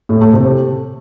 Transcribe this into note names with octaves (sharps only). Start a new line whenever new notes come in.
A2
A3
C3